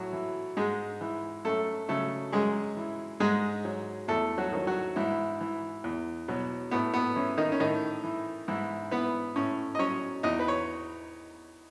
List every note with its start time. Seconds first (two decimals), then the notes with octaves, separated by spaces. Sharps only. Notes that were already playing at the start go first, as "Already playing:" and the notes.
Already playing: A2 F#3 F#4
0.13 E3
0.57 G#2 G#3 G#4
1.01 E3
1.45 F#2 A3 A4
1.89 C#3 F#3 A3 A4
2.32 F#2 G#3 G#4
2.77 E3
3.20 G#2 G#3 G#4
3.65 F#3
4.08 E2 A3 A4
4.38 F#3 F#4
4.52 D#3 F#3
4.67 F#3 F#4
4.96 G#2 E3 E4
5.40 E3
5.84 E2
6.28 B2 F#3
6.71 A2 B3
6.94 B3
7.16 E3 C#4
7.38 D#3 D#4
7.52 C#4
7.60 A2 D#3 D#4
8.04 E3
8.48 G#2 E3 E4
8.91 E3 B3 B4
9.36 A2 C#4 C#5
9.75 D#5
9.79 F#3 C#4 C#5
10.23 E2 D#4 D#5
10.39 B4
10.48 C#5